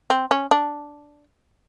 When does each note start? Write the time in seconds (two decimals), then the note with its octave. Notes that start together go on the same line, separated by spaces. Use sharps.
0.10 C4
0.31 C#4
0.51 D4